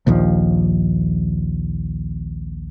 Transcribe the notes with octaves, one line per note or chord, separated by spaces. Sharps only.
A#1 D#2 F3